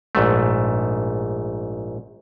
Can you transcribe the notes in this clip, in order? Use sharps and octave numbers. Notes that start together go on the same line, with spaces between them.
A#1 G#2 A3